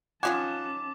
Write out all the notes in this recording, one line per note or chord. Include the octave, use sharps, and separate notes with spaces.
D#3 F3 C#4 F4 F#5 G#5 A5 D6